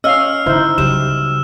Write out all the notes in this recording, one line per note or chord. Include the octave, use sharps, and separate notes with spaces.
C#4 D#5 F5 E6 F6
D3 D#4 E4 C5
C#3 F#3 G3 E7